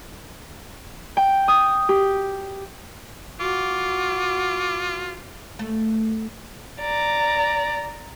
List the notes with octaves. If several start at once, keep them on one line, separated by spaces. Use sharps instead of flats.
G5
D#6
G4
F4 F#4 D6
A3
D5 A#5